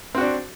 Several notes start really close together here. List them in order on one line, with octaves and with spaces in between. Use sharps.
C4 F#4 D4